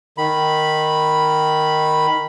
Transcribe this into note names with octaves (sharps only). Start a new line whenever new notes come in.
D#3 B5